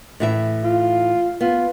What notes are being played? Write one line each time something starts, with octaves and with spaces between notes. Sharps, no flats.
A2 E3 E5
F4
B3 F4